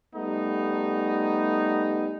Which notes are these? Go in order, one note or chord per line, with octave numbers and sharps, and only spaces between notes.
G3 A3 B3 D#4